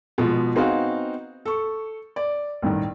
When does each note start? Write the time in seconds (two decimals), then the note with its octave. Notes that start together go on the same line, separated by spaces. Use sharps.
0.18 B2 F3 G#3
0.55 B3 C4 D#4 F#4 G#4 F5
1.45 A4 C#6
2.16 D5
2.62 A1 G2 D#3